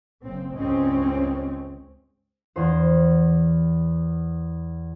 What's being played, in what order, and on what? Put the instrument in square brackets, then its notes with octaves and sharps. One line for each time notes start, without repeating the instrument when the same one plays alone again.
[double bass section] F#1 C4
C#2 G2 G#3 C4 C#4
[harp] E2 C5